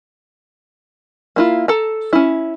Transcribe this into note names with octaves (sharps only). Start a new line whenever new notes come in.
A#3 E4 F4
A4 A#5
C#4 E4